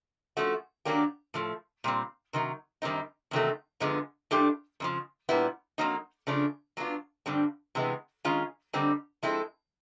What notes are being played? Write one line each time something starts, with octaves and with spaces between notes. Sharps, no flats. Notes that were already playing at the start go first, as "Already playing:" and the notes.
F3 A3 C#4 F#4
D#3 F#3 A#3 D4 G4
A2 F3 A3
A#2 G3 C4
C3 D#3 F#3
F#2 D#3 G3 C4 D#4
E2 C3 D#3 F#3 A3
F#2 D3 F3 G#3 B3
A2 F3 A3 D4 G4
F2 C#3 F3
A#2 G3 B3 E4
F2 C#3 F#3 A#3 D#4
C#3 F3 A3 D4
F#3 B3 D4 F4
G2 D3 G3 C4
C3 E3 G#3 B3
D#3 G#3 C#4 F4 G#4
D3 G3 C4 D#4
F3 G#3 C4 E4 A4